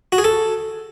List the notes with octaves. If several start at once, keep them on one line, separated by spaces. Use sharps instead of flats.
F#4
G#4
A4